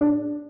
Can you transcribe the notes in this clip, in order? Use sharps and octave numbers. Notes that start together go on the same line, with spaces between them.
D4